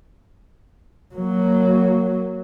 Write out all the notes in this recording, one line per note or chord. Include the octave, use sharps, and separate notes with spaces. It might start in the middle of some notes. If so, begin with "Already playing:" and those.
F#3 A#3